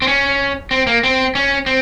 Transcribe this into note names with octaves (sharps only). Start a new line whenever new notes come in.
C4
C#4
C4
A#3
C4
C#4
C4